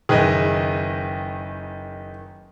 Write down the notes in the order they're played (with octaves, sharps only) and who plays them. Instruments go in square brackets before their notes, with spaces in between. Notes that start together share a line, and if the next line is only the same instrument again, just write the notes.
[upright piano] F#1 D#3 [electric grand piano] G#4 B4 D#5